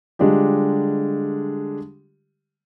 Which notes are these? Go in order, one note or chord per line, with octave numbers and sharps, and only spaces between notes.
D3 G3 G#3 D4 F4 G4